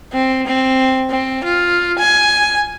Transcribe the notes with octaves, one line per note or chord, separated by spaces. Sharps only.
C4
C4
C4
F4
G#5